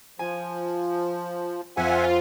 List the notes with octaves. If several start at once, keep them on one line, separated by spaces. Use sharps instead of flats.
F3 G#5
F2 F4 E5 F#5 G#5